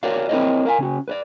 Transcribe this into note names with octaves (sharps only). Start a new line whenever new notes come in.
F#4 A#4 B4 C#5 D5 F5
C4 E4 A#4 C5 C#5 D#5
A#4 F5 G#5
C#3 C#4 F#4
B4 C#5 D5